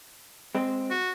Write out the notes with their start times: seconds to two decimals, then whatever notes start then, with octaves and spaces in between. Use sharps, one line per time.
0.55 G#3 C4
0.91 F#4